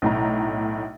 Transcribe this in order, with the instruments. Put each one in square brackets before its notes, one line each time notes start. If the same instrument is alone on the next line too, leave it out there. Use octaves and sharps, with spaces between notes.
[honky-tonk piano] B1 A2 A#5